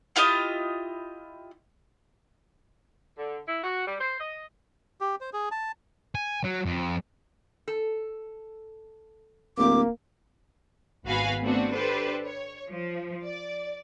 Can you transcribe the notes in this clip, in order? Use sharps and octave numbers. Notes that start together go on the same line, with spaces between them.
E4 F4 G4 D#5
D3
E4
F#4
G3
C5
D#5
G4
C5
G#4
A5
G#5
F#3
F2
A4
D1 A#3 D6
G#1 B3 F#4 F5 G#5 B5
A3 B3 C4 D4 F#4
D4 G4 A4 B4 C5
C#5
F3
D5